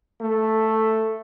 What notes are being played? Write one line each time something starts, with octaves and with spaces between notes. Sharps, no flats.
A3